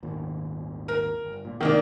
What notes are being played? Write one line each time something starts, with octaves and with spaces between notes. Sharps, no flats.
G#1 D#2 A#2
A#4
G1
A#2
G1 C3 D#3 A#3 D4